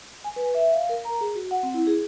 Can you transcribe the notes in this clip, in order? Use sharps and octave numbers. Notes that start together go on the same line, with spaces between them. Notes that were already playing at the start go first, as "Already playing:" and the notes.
G#5
B4
E5
F5
A#4
A#5
G#4
F#4
F#5
C4
E4
G#4